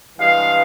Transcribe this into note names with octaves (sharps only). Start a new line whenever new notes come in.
G2 E3 G#3 F5